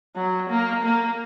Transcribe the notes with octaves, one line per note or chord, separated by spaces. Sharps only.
F#3
A#3
A#3